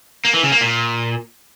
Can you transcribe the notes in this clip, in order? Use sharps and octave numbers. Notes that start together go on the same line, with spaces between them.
A#3
E3
C#3
A#3
A#2